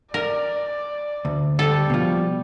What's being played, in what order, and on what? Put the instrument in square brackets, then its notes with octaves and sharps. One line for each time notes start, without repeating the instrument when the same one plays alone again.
[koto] A#4 [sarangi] D5
[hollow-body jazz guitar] D2
[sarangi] G3 [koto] A4
[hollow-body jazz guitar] B2 F3